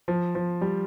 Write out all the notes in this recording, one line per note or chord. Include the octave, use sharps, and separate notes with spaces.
F3
F3
G3